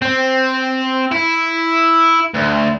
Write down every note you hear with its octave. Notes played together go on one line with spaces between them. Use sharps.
C4
E4
D2